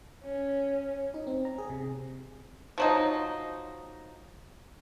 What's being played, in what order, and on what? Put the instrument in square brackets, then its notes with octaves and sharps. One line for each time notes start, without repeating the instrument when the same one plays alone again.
[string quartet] C#4
[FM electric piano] D#4
C4
A#5
G#4
C3
[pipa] F3 F#3 D#4